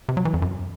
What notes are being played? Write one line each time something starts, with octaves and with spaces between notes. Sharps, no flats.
C3
F#3
E3
F2
F#2